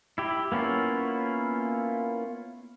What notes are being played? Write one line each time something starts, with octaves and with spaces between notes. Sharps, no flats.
E4 G4
A#3 B3 C#4 E4 F4